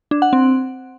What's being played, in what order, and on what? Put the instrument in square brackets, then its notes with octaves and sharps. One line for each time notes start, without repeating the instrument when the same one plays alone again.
[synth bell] D4
F#5
C4